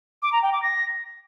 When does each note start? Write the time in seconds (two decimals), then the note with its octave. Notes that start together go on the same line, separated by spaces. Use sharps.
0.23 D6
0.33 A#5
0.43 G5
0.53 D6
0.63 A#6